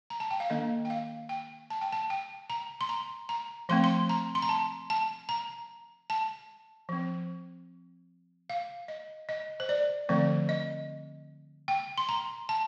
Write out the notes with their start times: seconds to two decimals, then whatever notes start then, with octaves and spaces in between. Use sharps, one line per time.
0.10 A#5
0.20 A5
0.31 G5
0.40 F5
0.50 D#3 A#3 D4 D#5
0.85 G5
0.90 F5
1.29 G5
1.70 A5
1.81 G5
1.93 A5
2.10 G5
2.50 A#5
2.81 C6
2.89 A#5
3.29 A#5
3.69 F3 A3 C4 C6
3.84 C6
4.09 A#5
4.35 C6
4.42 A#5
4.49 A5
4.90 A5
5.29 A#5
6.10 A5
6.89 F3 C4
8.50 F5
8.88 D#5
9.29 D#5
9.60 C5
9.69 D5
10.09 D3 F3 A3 C4 D5
10.49 D#5
11.68 G5
11.98 C6
12.09 A#5
12.49 A5